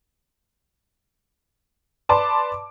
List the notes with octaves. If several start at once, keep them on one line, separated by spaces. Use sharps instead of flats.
B4 D5 A5 C6 D6